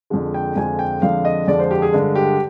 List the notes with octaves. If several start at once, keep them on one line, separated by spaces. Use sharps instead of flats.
F2 D3 F3 G#3
G5
F2 D3 F3 G#3 G#5
G5
F2 D3 F3 G#3 F5
D#5
F2 D3 F3 G#3 D5
C5
G4
G#4
G2 D3 G#3
G4